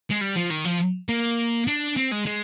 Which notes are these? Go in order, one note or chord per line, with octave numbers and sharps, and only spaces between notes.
G#3
G3
F3
D#3
F3
A#3
D4
C4
G#3
G#3